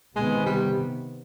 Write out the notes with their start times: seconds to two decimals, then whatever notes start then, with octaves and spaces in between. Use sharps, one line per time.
0.16 C3 D#3 G#3 B3
0.46 G3